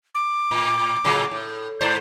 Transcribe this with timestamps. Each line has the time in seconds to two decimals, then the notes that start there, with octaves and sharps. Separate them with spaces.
0.15 D6
0.51 A2
1.04 A2 C#3 F#3
1.31 A2
1.81 G#2 C5 D5